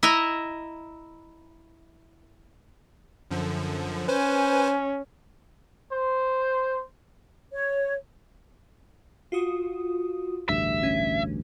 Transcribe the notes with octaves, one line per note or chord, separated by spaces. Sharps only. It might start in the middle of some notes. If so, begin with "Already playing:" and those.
E4 D#5 E5 A#5
F#2 D3 F3
C#4 B4 C5 G#5
C5
C#5
F4 F#4 D#6
A1 D2 G2 E5
C#4